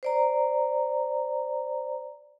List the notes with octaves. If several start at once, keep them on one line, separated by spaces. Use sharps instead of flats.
C5 D5 A#5